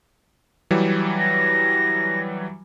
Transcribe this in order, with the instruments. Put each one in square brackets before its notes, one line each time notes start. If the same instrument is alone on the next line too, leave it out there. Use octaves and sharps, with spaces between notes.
[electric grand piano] E3 F#3 G3
[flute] A#6